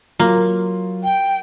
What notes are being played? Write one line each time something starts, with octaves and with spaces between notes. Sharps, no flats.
F#3 A#3 F4
G5